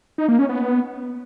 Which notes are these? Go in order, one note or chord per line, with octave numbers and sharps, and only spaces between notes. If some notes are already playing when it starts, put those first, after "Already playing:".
D#4
A#3
C#4
B3